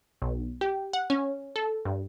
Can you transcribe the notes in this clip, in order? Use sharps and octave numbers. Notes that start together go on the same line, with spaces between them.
B1
G4
F#5
C#4
A4
G2